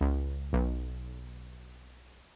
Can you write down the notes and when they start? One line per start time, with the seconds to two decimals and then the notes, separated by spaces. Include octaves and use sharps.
0.01 C#2
0.53 B1